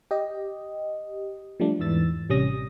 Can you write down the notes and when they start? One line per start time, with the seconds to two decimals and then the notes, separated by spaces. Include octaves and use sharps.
0.11 G4 D#5
1.60 F3 G3 A3 D4
1.79 E2 G#2 E3 E6 A6
2.29 A1 C3 G3 C#4 D#6 A#6